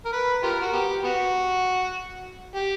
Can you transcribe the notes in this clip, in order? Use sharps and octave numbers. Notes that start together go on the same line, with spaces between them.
A#4
B4
F4 G4 A#4
F#4
B3 G4
B3 F#4
G4